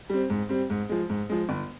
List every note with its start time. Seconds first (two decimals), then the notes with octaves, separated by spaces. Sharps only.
0.10 G3 C4
0.30 G#2
0.49 G3 C4
0.70 G#2
0.89 F3 G#3
1.10 G#2
1.29 F3 G#3
1.49 G1